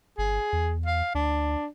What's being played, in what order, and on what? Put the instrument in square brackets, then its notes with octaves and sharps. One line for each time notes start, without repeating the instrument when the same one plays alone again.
[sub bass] G1 [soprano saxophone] G#4
[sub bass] E2
[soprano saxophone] F5
[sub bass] D2 [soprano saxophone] D4